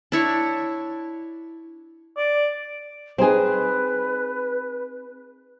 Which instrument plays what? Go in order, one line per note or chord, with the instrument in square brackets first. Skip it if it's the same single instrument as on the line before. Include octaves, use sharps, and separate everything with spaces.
[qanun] D4 E4 C#5
[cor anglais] D5
[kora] C4 D#4 G#4 [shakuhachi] B4